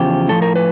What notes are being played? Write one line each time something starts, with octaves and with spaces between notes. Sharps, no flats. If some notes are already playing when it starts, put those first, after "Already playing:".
Already playing: E2 C#3 F3 G4
A2 F3 A4
A#4
B4